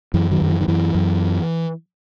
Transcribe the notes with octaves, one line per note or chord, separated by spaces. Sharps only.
F#2 E3
D#3 F#3
F#2
E3
D#3
F#2 E3
F#2